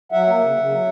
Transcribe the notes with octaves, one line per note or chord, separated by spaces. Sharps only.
F#3 E5 F#5
A#3
C#3
C#3
F#3